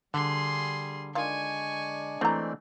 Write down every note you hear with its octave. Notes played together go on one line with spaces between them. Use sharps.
D3 G3 G#4 C6
D#3 G#3 D4 F4 D5 G#5 C#6
D3 E3 A3 C4 A#5